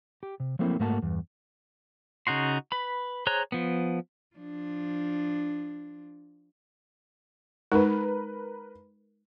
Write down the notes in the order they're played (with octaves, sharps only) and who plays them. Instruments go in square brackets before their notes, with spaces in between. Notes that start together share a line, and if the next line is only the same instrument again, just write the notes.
[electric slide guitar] G4
C3
F3 F#3 A3 A#3 C4 E4
G#2 A3 A#3 F#4 A5
E2 G2
[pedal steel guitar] C#3 D#4 F#4 C6
B4 B5
G#4 C5 C#5 A#5 F#6
F3 B3
[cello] F3 D4
[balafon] G#3 D#4 [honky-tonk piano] A#4 B4